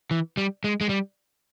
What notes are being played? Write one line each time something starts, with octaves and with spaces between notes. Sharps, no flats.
E3
G3
G#3
G#3
G3